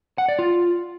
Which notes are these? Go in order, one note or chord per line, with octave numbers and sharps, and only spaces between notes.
F#5
D5
F4